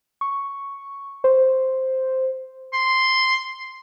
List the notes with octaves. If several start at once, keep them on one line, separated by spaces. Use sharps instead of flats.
C#6
C5
C6